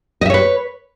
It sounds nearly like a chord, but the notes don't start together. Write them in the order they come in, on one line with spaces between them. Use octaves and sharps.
D#5 E5 C#5 B4